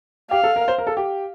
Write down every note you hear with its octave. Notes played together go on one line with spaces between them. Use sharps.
G4 F5
A4
A#4
C5
A#4
A4
G4